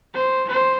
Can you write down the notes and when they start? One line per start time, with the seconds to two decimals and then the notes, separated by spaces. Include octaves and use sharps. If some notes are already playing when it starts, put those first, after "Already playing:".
0.14 C5
0.49 C5